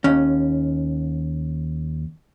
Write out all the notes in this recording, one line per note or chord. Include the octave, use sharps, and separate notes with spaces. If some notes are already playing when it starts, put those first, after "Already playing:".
D#2 C#4